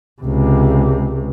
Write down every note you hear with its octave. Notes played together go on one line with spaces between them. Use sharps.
C#2 C3